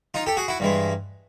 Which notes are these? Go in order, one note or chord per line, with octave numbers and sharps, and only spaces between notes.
D#4 F4
G4 A4
F#4 G#4
E4 F#4
G2 E3 G#3